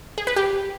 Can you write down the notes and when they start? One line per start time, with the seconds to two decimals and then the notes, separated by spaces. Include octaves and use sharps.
0.18 G#4
0.27 B4
0.36 G4